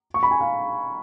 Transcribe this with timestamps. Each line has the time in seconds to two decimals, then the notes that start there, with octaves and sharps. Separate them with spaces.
0.14 C#6
0.23 B5
0.31 G#5
0.41 F5